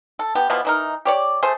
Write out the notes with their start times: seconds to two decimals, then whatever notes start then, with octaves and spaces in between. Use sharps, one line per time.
0.19 A4
0.35 B3 G4
0.50 B2 E3 F3 B3
0.65 E3 D#4 A#4
1.05 G4 C#5 D5
1.42 A3 G#4 C5